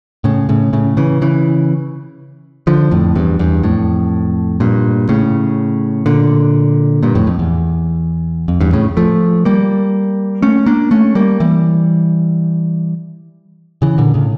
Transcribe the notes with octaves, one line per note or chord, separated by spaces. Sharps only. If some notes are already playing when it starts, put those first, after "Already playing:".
A2 C#3
A2 C#3
A2 C#3
C#3 E3
C#3 E3
D3 F3
F2 A2
E2 G2
E2 G2
F2 A2
G2 A#2
A2 C#3
A#2 D3
G2 A#2
F2 A2
F2
E2
F2
E2 G2
A2 C#3
F3 A3
G3 A#3
A3 C#4
A#3 D4
A3 C#4
G3 A#3
E3 G3
C#3 E3
A#2 D3
A2 C#3